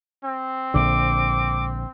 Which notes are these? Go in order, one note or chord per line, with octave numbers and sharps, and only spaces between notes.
C4
A#1 D3 D6